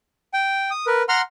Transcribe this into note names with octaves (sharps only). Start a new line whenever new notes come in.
G5
D#6
A#4 B4
F#5 A#5 C6 F6